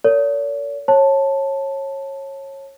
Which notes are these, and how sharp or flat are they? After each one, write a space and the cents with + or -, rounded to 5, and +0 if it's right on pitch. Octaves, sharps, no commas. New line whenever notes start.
A#4 -35 C#5 +45
C#5 -25 A5 +0